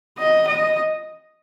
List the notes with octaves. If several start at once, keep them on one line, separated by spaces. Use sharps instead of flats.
D#5
D#5